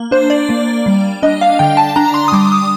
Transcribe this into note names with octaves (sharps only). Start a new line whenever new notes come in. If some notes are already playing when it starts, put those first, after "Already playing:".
Already playing: A#3
D4 C5
D5
A#3
G3
D4 D#5
F5
D3 G5
A5
D4 A#5
C6
D#6
G3 D6
D#6